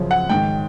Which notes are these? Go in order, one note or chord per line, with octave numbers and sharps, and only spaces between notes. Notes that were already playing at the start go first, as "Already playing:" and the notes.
Already playing: F#2 C#3 F3
F#5
G#2 D#3 G5